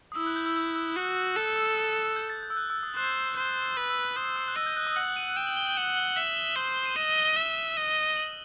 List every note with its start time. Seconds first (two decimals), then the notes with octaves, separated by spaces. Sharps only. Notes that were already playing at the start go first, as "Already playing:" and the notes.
0.12 D#6
0.16 E4 E6
0.27 F#6
0.36 G6
0.46 E6
0.56 E6
0.76 E6
0.96 F#4
1.36 A4 F#6
1.56 E6
2.16 G6
2.30 A6
2.43 G6
2.50 E6
2.57 F#6
2.70 E6
2.83 D#6
2.96 C5 F#6
3.37 C5
3.77 B4
3.90 E6
4.16 C5 D#6
4.36 E6
4.48 F#6
4.56 D#5 E6
4.66 G6
4.77 F#6
4.87 D#6
4.97 F#5 E6
5.16 D#7
5.36 G5 E7
5.47 F#7
5.57 G7
5.66 F#7
5.76 F#5 E7
5.97 G7
6.17 E5
6.27 F#7
6.37 G7
6.46 F#7
6.56 C5
6.85 D#7
6.97 D#5 E7
7.17 G7
7.37 E5 E7
7.77 D#5
8.17 F#7